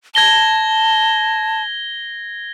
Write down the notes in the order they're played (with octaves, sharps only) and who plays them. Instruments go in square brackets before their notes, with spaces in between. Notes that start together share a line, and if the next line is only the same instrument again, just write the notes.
[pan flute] A5 [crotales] G#6 A#6 G7